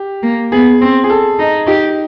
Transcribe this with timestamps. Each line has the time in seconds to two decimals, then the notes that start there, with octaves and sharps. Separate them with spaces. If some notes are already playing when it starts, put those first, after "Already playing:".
Already playing: G4
0.23 A#3
0.52 B3 G#4
0.81 C4
1.04 G#4
1.10 A4
1.39 D#4
1.67 D#4 G4